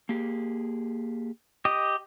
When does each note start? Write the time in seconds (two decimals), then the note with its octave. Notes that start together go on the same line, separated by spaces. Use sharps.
0.09 A#3 G4 G#4
1.65 G4 D#5